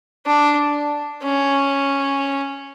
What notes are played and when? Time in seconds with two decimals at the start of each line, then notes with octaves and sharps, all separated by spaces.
0.26 D4
1.24 C#4